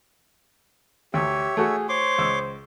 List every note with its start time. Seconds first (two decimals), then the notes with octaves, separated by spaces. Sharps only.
1.14 D2 G4 C#5 E5
1.57 A3 F#4 G#4
1.89 C5 C#5 C6 D6
2.18 C#2 E6